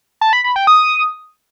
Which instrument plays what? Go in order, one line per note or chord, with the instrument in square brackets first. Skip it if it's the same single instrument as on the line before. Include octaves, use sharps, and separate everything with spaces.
[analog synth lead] A5
B5
B5
G5
D#6